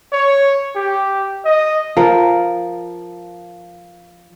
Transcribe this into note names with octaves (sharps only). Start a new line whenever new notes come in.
C#5
G4
D#5
F3 A#4